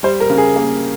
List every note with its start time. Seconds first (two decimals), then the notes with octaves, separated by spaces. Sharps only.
0.03 G3 C5
0.20 A#4
0.30 C#3
0.38 G#4
0.56 A#3